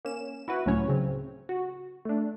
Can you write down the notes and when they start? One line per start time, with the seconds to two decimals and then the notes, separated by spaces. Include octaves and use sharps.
0.05 A#3 C#4 E7
0.48 E4 F#4 B4
0.66 C#2 A2 F#3 C#4 C#5
0.89 C#3 C4
1.49 F#4
2.05 A3 D4